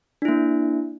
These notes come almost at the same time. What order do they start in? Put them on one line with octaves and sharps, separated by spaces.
D4 E4 A#3